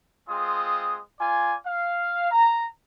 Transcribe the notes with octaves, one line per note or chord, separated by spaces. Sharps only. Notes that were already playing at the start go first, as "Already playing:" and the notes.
G#3 C4 F4 D#6
F4 D5 G#5
F5
A#5